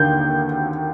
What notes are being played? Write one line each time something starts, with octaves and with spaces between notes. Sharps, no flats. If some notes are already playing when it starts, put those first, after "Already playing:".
Already playing: D#2 D3 G6